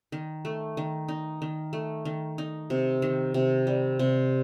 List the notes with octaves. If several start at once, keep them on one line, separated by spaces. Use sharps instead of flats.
D#3
A3
D#3
D#4
D#3
A3
D#3
D#4
C3
D#3
C3
G3
C3